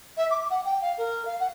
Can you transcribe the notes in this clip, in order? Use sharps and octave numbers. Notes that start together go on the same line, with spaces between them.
E5
D6
F#5
G5
F5
A#4
F5
F#5